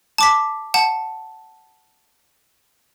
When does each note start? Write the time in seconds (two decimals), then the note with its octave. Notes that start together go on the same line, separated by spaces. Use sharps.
0.18 A5 D6 B6
0.74 F#5 A5